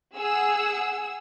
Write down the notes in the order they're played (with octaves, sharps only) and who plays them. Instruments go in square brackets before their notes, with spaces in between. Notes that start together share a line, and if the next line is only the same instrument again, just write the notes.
[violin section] G#4 F#5 E6